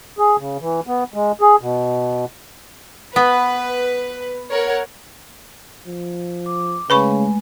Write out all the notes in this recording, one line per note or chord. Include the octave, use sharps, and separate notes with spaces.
G#4
C#3
E3
B3
G#3
G#4
B2
B3 B4
A#4 C#5 F#5
F3
D6
C#3 G#3 A3 B4 G#5 B5 C#6